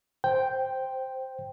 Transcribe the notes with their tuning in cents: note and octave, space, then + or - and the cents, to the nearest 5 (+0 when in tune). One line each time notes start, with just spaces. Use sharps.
C5 +0 G5 +0